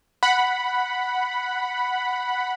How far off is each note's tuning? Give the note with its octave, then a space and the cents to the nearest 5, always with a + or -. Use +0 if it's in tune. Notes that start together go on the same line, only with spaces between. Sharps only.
F#5 +0 B5 +0